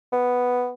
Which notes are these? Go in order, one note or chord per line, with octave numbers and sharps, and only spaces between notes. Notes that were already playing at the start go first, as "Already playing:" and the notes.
B3